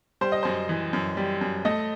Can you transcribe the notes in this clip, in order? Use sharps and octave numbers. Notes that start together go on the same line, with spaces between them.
G3 C5
D#5
F#2 C5
E3
F#2
G3
F#2
A3 D#5